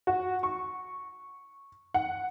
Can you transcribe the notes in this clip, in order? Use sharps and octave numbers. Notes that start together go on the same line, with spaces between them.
F#4
C#6
F#5